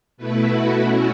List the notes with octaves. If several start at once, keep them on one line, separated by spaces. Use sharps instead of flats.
B2 A3 E4 B4
F#4
B2 A3 C#4 E4 F#4